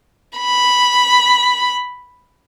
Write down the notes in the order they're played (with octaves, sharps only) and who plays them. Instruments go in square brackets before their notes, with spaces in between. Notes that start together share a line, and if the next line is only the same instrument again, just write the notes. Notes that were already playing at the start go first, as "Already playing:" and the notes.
[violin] B5